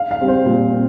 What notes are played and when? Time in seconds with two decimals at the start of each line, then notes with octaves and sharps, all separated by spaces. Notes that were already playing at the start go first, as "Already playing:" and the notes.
Already playing: F5
0.11 F5
0.20 G3 C4
0.28 C5
0.46 A#2
0.72 C4